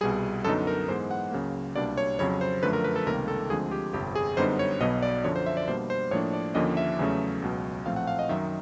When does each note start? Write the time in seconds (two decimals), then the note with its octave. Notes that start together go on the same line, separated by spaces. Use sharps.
0.01 C2 B2 G3 G#4
0.44 F#2 D3 F#3 B3 D#4 A4
0.67 A#4
0.88 G#2 E3 G#3 B3 C5
1.11 F#5
1.31 C#2 C#3 F#3 A#3
1.75 C2 B2 G3 A#3 D4 D5
1.97 C#5
2.19 F2 C#3 F#3 C#5
2.41 C5
2.63 F#2 D3 F3 A3 B4
2.73 A#4
2.84 B4
2.96 A4
3.07 C#2 C3 D#3 G3 A#3 A#4
3.28 A4
3.50 D2 D3 F3 G#3 C4 G#4
3.71 G4
3.93 G1 F2 C3 G4
4.15 G#4
4.37 F#2 D3 G3 B3 D#4 C5
4.59 C#5
4.80 B1 B2 F#3 B3 D#5
5.02 D5
5.24 F#2 D3 F3 C#5
5.36 C5
5.46 E5
5.57 D5
5.68 B2 G3 A#3 D4 C5
5.90 C5
6.11 A2 F3 A#3 D4 C#5
6.33 D5
6.55 D#2 D3 F3 A#3 C#4 D#5
6.77 E5
6.99 E2 C#3 F#3 A3 C#4
7.42 C#2 B2 F#3
7.86 A#1 A2 F3 A3 C4 F5
7.96 F#5
8.07 F5
8.19 D#5
8.29 F#2 D#3 F#3 E5